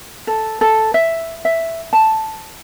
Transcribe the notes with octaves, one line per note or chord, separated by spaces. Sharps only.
A4
A4
E5
E5
A5